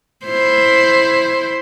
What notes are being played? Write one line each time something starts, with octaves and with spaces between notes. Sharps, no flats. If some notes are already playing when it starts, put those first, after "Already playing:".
E4 C5